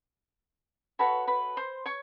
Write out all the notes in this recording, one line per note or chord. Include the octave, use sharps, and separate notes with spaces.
F#4 A4 B4 C#5 B5
B4 B5
C5 C6
C#5 C#6